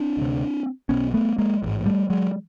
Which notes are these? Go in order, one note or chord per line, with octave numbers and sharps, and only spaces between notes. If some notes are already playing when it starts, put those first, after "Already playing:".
Already playing: C4 D4
D2 C3
B1 B2 B3 C#4
A3 B3
G#3 A#3
A1 G#2
G3 A3
F#3 G#3